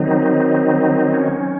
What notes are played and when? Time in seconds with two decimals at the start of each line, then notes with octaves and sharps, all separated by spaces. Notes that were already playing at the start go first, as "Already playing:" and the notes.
Already playing: D#3 F#3 C4 D#4
1.13 C#4